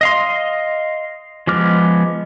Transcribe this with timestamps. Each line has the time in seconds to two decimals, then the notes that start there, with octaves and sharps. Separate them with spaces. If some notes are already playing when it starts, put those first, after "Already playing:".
0.01 D#5 F5 C6
1.47 F3 G#3 B3 D6 F6